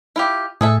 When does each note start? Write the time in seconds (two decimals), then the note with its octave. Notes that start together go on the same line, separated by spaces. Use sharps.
0.16 E4 F4 G4
0.61 A2 G#4 A4 E5